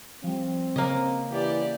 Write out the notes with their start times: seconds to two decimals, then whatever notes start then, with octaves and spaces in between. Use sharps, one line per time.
0.24 F3 G3 C4
0.76 C#3 A#3 D#5
1.31 E3 G4 D5